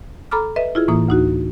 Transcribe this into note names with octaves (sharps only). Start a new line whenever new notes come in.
A4 A#5 B5 D6 F6
B4 D#5 E5
E4 F4 G#4
A2 E3 A#3 D#6
D2 D#4 F#4